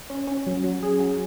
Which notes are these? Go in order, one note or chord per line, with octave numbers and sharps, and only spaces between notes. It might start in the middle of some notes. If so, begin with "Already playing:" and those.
C#4
C#4
F#3
F#3
G#4
F#3